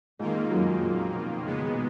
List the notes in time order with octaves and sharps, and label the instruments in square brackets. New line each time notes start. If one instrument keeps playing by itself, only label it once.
[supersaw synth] F2 D#3 A#3 F4 [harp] G#2
[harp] F#2
G#2
A#2
B2
[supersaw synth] A#2 G#3 B3 [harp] C#3
[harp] B2 D#3